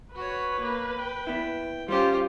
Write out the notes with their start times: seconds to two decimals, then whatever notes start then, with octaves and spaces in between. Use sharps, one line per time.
0.15 F#4 B4 C#5
0.59 A#3
0.98 G5
1.27 B3 E4
1.88 G3 C#4 F4 G4 C5